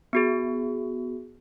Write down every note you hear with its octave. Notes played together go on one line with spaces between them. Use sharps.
B3 F#4 G#4